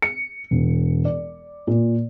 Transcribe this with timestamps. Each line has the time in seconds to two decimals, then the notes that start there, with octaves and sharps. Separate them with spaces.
0.02 C#7
0.51 E1
1.05 D5
1.67 A#2